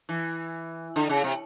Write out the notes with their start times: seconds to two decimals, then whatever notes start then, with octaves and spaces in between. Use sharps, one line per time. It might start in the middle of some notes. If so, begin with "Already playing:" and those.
0.09 E3
0.96 D3
1.09 C#3
1.24 C3